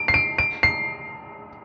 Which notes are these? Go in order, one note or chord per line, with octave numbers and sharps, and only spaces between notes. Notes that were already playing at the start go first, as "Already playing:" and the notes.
Already playing: D7
C7
D7
D7
C7